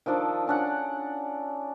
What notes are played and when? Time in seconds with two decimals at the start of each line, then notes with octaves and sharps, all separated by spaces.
0.06 D#3 F3 D4 A4
0.47 C#4 D4 F#5